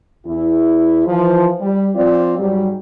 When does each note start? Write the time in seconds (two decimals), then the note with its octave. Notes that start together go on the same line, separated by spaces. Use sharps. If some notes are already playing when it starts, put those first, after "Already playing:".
0.25 E2 E4
1.07 E3 F3
1.61 G3
1.95 F3 C4 F4 D5
2.39 G#2 F#3 G3